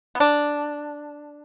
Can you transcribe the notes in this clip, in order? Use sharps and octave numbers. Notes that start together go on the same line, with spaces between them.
B3
D4